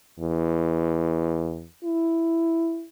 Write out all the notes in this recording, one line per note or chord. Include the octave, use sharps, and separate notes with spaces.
E2
E4